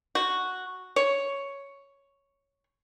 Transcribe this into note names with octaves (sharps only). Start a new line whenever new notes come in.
F#4
C#5